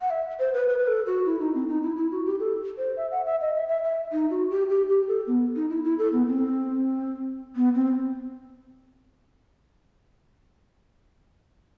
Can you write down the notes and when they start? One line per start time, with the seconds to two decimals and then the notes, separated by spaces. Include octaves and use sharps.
0.01 F#5
0.10 E5
0.40 C5
0.54 B4
0.68 B4
0.79 B4
0.87 A4
1.06 F#4
1.26 E4
1.40 D#4
1.54 C4
1.68 D#4
1.83 E4
1.96 E4
2.12 F#4
2.26 G4
2.40 A4
2.78 C5
2.97 E5
3.11 F#5
3.26 E5
3.41 D#5
3.55 E5
3.68 E5
3.84 E5
4.12 D#4
4.30 F#4
4.50 G4
4.70 G4
4.89 G4
5.08 A4
5.27 B3
5.56 D#4
5.70 E4
5.84 E4
5.98 A4
6.12 B3
6.27 C4
7.56 B3
7.75 C4